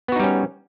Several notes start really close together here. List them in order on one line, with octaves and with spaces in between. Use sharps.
B3 F#4 D#4 G3 C#4